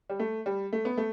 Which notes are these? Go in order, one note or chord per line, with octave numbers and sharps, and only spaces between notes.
G3
A3
G3
A3
B3
A3